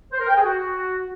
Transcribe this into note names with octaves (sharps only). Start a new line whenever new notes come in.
C5
A#4
G5
G#4
F#4